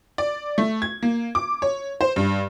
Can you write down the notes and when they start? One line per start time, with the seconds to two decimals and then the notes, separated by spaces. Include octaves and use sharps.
0.18 D5
0.58 A3
0.82 G#6
1.03 A#3
1.35 D6
1.62 C#5
2.01 C5
2.16 G2